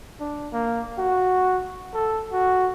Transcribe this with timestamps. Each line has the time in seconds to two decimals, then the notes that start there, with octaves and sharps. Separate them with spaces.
0.21 D4
0.53 A#3
0.98 F#4
1.94 A4
2.32 F#4